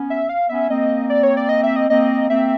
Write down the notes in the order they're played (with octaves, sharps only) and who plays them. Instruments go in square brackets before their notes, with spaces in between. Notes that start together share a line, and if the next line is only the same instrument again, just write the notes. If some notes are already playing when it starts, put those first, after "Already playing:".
Already playing: [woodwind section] B3 C#4
[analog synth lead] E5
F5
[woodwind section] B3 C#4 [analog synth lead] E5
[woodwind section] A#3 C4 [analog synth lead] D#5
[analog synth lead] D5
C#5
D5
D#5
E5
D#5
[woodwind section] A#3 C4 [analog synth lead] D#5
[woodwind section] A#3 C4 [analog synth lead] E5